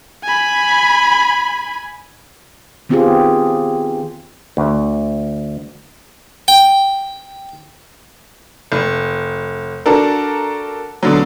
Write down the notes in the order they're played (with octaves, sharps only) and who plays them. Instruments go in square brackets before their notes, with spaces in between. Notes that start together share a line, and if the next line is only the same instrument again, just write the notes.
[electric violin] G#5 B5
[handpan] D#3 B3 C4 F4 G4 G#4
[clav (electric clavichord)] D2
[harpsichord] G5
[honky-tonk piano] F1
D4 F#4 A4 A#4
B2 D3 F#3